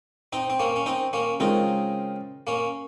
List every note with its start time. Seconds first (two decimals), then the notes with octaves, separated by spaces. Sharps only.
0.33 C4 D#4
0.50 C4
0.60 A#3 C#4
0.76 C#4
0.86 C4 D#4
1.13 A#3 C#4
1.40 C#3 G#3 C4 C#4 D#4 F4 A#4
2.47 A#3 C#4